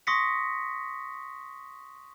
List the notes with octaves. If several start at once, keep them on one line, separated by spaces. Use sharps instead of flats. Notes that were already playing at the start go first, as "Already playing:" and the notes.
C6 C#6 D#6 A#6 B6 C#7